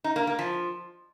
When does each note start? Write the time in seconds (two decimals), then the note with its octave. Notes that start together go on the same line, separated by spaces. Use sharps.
0.04 D#4
0.16 A#3
0.27 A#3
0.39 F3